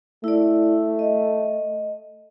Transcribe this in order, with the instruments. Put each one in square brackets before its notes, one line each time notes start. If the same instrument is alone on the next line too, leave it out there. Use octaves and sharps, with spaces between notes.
[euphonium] A3 [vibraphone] E4 D5
[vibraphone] D#5